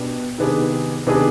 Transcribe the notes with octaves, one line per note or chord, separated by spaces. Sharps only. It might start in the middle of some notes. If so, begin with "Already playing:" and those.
Already playing: B2 B3 D4 G4
C3 D#3 B3 D4 G#4
C3 D#3 B3 D4 G#4